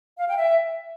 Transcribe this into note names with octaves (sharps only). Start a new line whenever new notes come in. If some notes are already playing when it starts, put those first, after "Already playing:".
F5
G5
E5